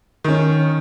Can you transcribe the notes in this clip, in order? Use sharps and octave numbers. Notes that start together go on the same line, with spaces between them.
D#3 C#4